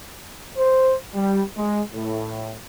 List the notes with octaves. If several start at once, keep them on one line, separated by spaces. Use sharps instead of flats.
C5
G3
G#3
A2